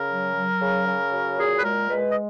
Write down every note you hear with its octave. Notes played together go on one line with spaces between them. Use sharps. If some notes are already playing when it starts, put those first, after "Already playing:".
Already playing: C#3 A#4
F#3
F#3
C#3
C#3
F#3
A#2 G#4
B4
G#3 A#4
G#3 B4
D#5